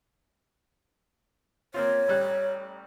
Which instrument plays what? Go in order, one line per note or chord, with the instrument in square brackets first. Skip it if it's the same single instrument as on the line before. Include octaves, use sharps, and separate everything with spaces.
[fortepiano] A#3 C4 F4 [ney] C#5
[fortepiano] A1 G3 F#6